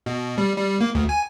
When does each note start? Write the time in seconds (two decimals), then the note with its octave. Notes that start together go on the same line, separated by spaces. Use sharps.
0.06 B2
0.38 G3
0.56 G3
0.81 A#3
0.95 D2
1.09 G#5